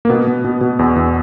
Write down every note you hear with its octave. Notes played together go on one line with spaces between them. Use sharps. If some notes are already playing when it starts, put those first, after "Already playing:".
A#3
B2 B3
B2
B2
B2
E2
E2